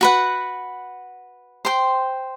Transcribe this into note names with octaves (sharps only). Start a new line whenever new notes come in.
F#4 B4 F#5
C5 G5 C6